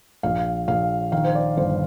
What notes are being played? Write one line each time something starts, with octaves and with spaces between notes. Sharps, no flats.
A#1 F5
A#1 F5
D#3 F5
C5
D5
G1 C5